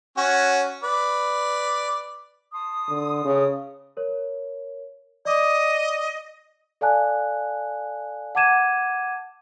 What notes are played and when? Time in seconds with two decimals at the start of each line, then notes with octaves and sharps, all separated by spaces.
0.17 C#4 F#4
0.84 B4 D5
2.53 A5 C6 D#6
2.89 D3
3.25 C#3
3.97 A#4 C#5
5.25 D5 D#5 D6 D#6
6.81 A4 D5 F5 G#5 A5 F#6
8.35 F#5 A5 D6 G#6 D#7 E7